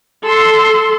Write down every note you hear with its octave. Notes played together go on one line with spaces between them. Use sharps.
A4 C6